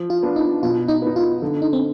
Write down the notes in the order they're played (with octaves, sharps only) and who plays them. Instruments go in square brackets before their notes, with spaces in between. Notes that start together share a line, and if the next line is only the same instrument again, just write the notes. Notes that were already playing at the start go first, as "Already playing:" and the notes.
Already playing: [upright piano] F3
[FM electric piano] F4
[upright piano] B3 D4 F4
[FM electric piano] D#4
[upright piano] B2 [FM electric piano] F4
[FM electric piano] D#4
[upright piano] B3 D#4
[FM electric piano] F4
[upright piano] D3
[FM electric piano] D#4
C4